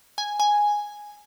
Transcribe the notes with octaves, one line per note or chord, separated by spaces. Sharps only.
G#5
G#5